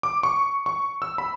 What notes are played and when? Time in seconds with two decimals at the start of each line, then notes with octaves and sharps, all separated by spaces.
0.03 D6
0.23 C#6
0.66 C#6
1.02 E6
1.18 B5